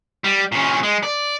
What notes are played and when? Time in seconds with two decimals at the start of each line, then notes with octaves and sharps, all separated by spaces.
0.24 G3
0.52 A#2 C#4
0.83 G#3
1.03 D5